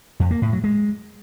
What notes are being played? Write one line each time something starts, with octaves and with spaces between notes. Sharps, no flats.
F2
A#3
A2
F#3
G#3